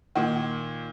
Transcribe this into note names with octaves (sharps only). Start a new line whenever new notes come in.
A#2 D#3